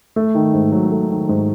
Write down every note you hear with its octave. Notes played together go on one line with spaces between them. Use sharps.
A3
D#3
G#2
F#3
A3
D#3
G#2